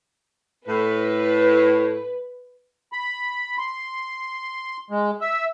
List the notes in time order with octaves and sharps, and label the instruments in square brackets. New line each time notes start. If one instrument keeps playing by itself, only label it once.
[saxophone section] A2 [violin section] B4
[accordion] B5
C6
G#3
E5